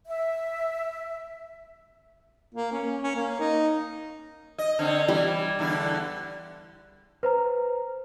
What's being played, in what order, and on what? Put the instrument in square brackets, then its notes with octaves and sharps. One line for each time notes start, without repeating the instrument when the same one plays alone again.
[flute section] E5
[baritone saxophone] A#3
C#4
C#4
A#3
D#4
[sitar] D#5
D3 C4 C#4
[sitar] E3 [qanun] G3
[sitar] E2 D3 E4
[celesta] B4 C5 A#5